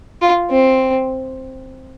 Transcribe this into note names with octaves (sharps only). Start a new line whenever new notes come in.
F4
C4